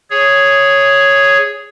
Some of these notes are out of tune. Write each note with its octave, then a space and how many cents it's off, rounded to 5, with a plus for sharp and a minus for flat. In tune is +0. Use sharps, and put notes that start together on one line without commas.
G#4 -5 C#5 +0